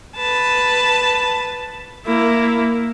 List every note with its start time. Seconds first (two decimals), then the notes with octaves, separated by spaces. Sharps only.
0.16 B4 A5
2.06 A#3 E4